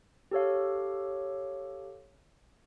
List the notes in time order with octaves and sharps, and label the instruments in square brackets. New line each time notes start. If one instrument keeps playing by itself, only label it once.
[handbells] G4 A4 C#5 F5